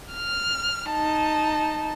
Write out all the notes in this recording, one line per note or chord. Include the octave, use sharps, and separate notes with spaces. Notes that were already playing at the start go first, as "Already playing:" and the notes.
F6
D#4 A5